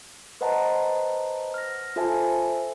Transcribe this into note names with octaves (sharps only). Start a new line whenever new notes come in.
B4 C5 D#5 F#5 A5 A#5
F6 A#6
F4 A4 C5 E5 G#5 A5